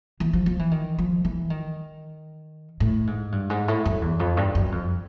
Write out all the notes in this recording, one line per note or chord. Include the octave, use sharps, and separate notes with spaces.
E3
F3
F3
E3
D#3
F3
E3
D#3
A2
G#2
G2
G#2
A2
F#2
E2
F2
G2
F#2
F2